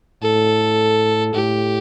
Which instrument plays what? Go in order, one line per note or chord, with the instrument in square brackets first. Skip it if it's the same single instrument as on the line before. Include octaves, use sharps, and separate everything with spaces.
[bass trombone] A2 [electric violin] A4
[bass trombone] A2 [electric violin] G4